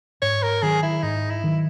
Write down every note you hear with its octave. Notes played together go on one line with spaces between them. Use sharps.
G#2 C#5
A#4
D#3 F#3 G#4
E4
G#2 D#4
E4
D#3 F#3